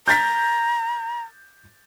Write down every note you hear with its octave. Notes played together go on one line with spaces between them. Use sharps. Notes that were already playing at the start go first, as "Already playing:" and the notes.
A#5 G6 A6 B6